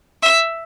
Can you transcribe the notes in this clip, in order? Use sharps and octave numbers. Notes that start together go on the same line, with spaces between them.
E5